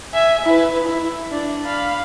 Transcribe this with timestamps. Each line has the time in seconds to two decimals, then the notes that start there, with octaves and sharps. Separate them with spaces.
0.13 E5 G#5
0.45 E4 B4
0.84 E4
1.32 D4
1.65 F5 B5